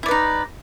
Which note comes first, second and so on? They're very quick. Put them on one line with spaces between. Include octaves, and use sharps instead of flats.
E4 D5 B4 D#4